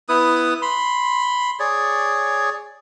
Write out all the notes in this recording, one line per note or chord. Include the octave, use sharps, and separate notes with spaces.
B3 E4 B4 D#6
B5 C6
G#4 C#5 D5